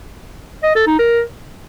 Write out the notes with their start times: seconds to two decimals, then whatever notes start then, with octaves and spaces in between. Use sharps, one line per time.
0.63 D#5
0.75 A4
0.87 D#4
0.99 A#4